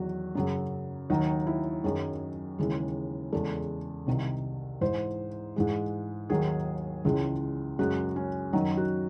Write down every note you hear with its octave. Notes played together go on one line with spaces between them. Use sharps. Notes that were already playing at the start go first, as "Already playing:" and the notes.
Already playing: E2 D#3 F#3 F#4
F#2 C#3 F#3
D#2 D#3 F#3 D#4
E4
F#2 D#3 F#3 G#4
D#2 C#3 E3 G#3
E2 C#3 G#3 A4
C2 C3 D#3
G#2 E3 G#3 C5
G#2 E3 G#3
D#2 D#3 F#3 G#4
C#2 C#3 E3 G#3
F#2 C#3 G#3 F#4
C#4
F#2 D#3 F#3 D#4
F#4